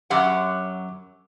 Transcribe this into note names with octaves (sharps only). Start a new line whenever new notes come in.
F#2 F#3 G4 F#5